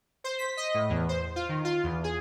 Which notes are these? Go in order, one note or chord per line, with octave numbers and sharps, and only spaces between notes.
C5
B6
D#5
A2
E2
C5
F4
D#3
F4
E2
G#4